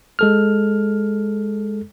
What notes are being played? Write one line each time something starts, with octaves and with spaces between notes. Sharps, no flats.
G#3 A4 F6